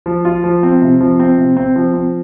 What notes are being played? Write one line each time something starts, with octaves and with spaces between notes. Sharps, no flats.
F3
F4
F3
C4
C3
F3
C4
C3
C4
F3
C4